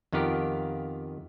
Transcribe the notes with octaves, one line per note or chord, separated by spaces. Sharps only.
F2 D#3 B3 F4 G4 A#4